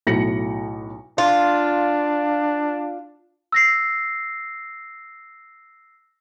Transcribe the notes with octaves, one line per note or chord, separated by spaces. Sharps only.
B1 A2 F#3 A#6 C#7 F#7
D4 F4
E6 A#6 C7